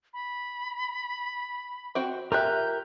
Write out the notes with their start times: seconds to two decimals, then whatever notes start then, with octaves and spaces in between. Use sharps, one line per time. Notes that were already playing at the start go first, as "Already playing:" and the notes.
0.13 B5
1.95 C4 F#4 G5
2.32 F4 G4 A#4 E5 F#6 G6